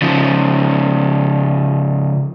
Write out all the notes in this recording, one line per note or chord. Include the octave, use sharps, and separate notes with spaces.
C#3 F3